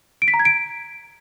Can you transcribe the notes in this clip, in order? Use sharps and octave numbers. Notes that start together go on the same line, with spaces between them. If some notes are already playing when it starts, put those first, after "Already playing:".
D7
B6
A#5
G#6
D7